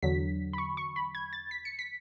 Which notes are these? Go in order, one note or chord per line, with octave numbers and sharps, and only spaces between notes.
E2 D3 F#3 B6
B5
C#6
C#6
B5
G#6
A6
B6
C#7
B6